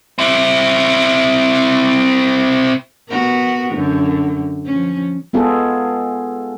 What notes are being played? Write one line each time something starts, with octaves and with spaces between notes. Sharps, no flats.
C4 E4
B3 F#4 A#4
F#2 D3
F3 C#4
G#3 B3 F4 G#4 A4